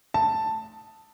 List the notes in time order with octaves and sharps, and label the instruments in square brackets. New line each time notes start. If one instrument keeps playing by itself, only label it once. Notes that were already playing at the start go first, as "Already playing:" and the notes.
[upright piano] A5